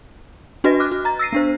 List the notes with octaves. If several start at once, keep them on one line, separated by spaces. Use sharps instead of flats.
D4 F#4 B4 D#5 A#6
D6 F6 F#6
F#4
A#5 A6
E6 A#6 C7 D#7
B3 D4 C5